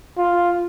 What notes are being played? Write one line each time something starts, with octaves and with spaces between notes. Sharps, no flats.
F4